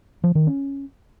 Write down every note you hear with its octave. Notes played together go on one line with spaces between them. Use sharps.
F3
D#3
C#4